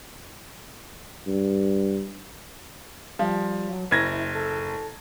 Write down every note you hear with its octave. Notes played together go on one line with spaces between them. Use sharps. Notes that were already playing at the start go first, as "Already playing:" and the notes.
G2
F3 G3
F#3
F#1 E4 G#6 A#6
A4